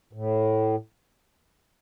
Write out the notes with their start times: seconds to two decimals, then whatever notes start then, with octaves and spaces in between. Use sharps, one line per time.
0.13 A2